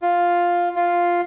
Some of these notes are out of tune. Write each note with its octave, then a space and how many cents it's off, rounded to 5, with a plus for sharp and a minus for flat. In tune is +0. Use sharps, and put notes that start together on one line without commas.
F4 +5
F4 +0